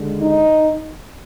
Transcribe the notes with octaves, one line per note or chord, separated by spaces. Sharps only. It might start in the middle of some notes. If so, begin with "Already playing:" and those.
Already playing: D#2 D3 G#3
D#4